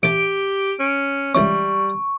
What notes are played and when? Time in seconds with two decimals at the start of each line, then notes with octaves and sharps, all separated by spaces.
0.03 A1 G4 A5 D7
0.79 C#4
1.35 C#2 E3 G3 C#4 C#6